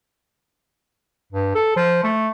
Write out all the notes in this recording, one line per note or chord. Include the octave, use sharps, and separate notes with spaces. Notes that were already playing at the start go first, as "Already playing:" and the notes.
G2
A4
F3
A3